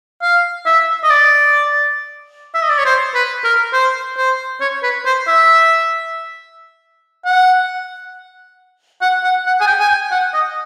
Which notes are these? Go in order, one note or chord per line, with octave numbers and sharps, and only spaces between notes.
F5
E5
D#5
D5
E5
D#5
D5
C#5
C5
B4
A#4
C5
C5
C#5
B4
C5
E5
F#5
F#5
F#5
F#5
G#5
G5
G#5
G5
F#5
D#5